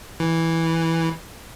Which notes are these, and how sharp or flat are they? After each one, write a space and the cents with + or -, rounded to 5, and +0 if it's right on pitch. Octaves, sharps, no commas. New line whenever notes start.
E3 -5